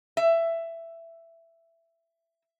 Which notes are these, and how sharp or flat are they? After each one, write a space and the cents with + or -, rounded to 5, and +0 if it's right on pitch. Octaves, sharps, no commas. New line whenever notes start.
E5 +15